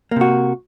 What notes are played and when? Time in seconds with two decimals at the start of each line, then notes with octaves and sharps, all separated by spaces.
0.11 A#3
0.16 C3
0.21 F#4